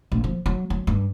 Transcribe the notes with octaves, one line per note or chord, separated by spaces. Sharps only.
A#1
F3
F#3
F#3
G2